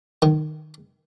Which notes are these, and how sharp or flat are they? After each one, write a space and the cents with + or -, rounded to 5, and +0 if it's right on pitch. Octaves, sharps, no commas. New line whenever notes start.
D#3 -20